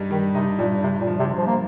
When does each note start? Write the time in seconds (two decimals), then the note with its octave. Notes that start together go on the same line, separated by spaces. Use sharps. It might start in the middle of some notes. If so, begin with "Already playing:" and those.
Already playing: G2 G3 D#4
0.11 D#3 G3
0.35 C3 D#4
0.58 G2 A#2
0.83 G2 C3
1.01 A#2
1.07 F3
1.19 C3
1.31 G2
1.38 F3
1.47 A#3